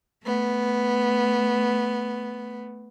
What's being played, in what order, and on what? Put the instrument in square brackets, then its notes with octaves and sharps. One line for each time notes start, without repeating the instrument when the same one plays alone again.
[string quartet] A3 B3